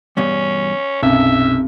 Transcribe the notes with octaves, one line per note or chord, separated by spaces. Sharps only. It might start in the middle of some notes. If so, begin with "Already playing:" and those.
E2 G2 B2 C#4
B1 F#2 C3 E5